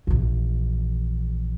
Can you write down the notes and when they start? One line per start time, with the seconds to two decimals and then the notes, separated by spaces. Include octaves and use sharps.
0.07 A#1 E2